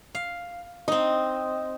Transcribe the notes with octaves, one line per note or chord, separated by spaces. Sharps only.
F5
C4 D#4 D#5